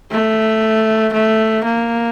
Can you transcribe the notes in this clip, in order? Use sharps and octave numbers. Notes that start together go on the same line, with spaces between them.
A3
A3
A#3